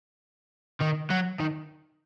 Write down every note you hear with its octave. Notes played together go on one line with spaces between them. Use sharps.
D#3
F#3
D#3